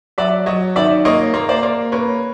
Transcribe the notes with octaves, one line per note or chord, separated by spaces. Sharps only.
F#3 D5 E5
F#3 C#5 D#5
D#3 D5 E5
A#3 C#5 D#5
A#3
C5 D5
A#3
A#3 B4 C#5